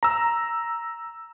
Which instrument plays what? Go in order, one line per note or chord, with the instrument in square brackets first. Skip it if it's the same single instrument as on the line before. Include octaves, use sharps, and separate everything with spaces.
[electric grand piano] A#5 E6